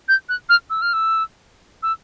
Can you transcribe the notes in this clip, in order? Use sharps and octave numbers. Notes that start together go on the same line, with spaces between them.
G6
F#6
F6
E6
F6
E6
E6